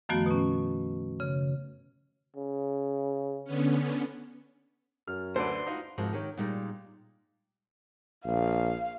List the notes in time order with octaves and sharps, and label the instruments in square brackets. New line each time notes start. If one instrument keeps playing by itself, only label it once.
[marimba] F#2 D#3 F3 A3 B3 F#4
B2 C#4
C#3
[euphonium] C#3
[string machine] D3 B3 C#4
[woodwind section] F#2 [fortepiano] F6
[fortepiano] D2 D3 B4 [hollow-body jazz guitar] C5 D5 [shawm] C6
[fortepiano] D#4 F4 F#4
[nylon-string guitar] G#2 C3 F3 A#3 F#4
D#3 G4 C#5
A#2 G3 G#3 D#4 G4
[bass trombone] A#1 [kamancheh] F5